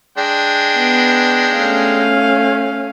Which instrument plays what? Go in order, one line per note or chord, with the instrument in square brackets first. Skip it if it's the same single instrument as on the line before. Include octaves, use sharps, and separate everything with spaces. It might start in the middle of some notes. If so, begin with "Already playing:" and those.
[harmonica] G#3 D4 G5
[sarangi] B3
[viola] A3 C#4 [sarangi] F5